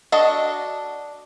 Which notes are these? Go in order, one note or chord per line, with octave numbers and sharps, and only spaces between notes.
D4 F#4 A4 D#5